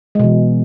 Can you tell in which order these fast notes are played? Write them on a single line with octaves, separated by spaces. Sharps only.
G#3 B2 E3